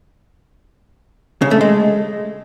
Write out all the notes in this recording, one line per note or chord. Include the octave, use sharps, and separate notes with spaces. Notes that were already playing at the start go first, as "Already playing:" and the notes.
C#3
A3
G#3